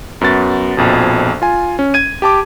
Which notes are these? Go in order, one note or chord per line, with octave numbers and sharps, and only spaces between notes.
F#2 B3 F#4 A6
A#1 F2 B2
F4 G#5
C#4
G#6 D#7
G4 A5 D6